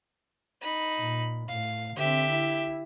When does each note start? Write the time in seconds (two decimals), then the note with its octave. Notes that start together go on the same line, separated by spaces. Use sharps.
0.61 D#4 B5
0.98 A#2
1.48 A2 F5
1.96 D3 C4 G4 E5
2.30 E4